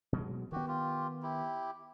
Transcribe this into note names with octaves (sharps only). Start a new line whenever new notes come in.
B2 F#3 G#3
D#3 B3 F#4 G4
F4 G4
E4 G4